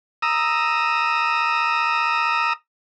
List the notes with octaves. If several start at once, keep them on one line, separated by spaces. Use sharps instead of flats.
A#5 D#6 E6